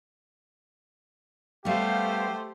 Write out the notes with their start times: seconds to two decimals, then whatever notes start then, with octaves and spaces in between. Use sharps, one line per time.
1.65 G3 A3 B3 G4 C5 F5